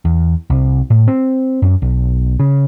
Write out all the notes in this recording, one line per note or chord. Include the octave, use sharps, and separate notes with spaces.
E2
C2
A2
C4
F#2
B1
C#3